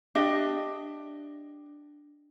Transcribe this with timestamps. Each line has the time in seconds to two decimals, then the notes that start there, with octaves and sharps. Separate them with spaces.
0.15 D4 G4 D#5 E5